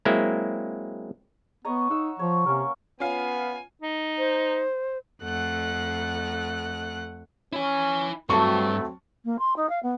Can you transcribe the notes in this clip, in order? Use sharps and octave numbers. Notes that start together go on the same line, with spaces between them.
F#3 G#3 A#3 C4 E4
B3 C#5 D#5 A#5
D#4 F#5 E6
F3 C#5
C3 A#3 C#4 A#4
B3 C#4 F4 F5 G#5
D#4
C5
F2 A3 F#5 F#6
C#4 E4 G#5
G2 F#3 A3 C4 A5 C#6
A#3
C6
D#4
F5
B3